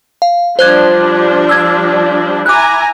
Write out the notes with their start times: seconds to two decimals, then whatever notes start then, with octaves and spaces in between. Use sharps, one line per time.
0.22 F5
0.59 F3 G3 D4 C5 F#6 G#6
1.49 E6 G#6
2.46 E4 G#5 A#5 D6 F#6